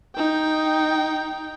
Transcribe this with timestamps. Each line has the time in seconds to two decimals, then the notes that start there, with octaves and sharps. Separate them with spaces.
0.16 D#4 G5